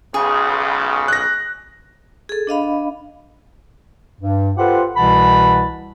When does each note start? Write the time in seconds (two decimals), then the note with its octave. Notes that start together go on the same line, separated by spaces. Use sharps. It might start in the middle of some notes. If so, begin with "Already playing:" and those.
0.14 B1 C#3 G#4
1.08 F#6 A#6
2.29 G#4 A4
2.47 D4 D#5 F5 B5
4.21 G2
4.57 F4 G4 A4 B4 C5 F#5
4.97 C2 B2 E3 F#5 A5 B5